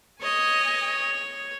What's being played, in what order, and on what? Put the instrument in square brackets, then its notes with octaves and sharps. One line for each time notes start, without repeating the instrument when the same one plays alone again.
[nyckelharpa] C#5 [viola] D#5 G#5